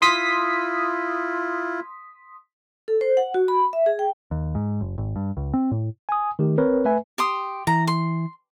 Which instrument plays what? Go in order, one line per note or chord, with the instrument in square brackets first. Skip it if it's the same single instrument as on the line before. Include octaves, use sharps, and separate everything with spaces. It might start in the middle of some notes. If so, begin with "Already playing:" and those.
[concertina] E4 F4 [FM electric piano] C6 D#6 B6
[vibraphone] A4
C5
F#5
F#4
B5
E5
G#4
G5
[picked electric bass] D#2
G#2
F#1
G#1
G2
C#2
C4
A2
[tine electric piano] G#5 D#6
D#3 A3 G4
G1 C4 A#4 B4 C#5
A3 B4 E5 G#5
[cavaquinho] G4 C6 D#6
[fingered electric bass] E3 [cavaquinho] A#5
[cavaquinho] C6